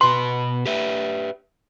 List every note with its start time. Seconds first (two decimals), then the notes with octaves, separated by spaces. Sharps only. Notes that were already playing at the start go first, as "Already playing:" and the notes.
0.01 B2 B4 C6
0.66 G4 B4 E5